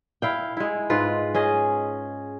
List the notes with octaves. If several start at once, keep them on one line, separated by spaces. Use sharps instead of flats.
E4 F5 G5
G#3 E4
G#2 F4 B4
C#4 G#4 D#5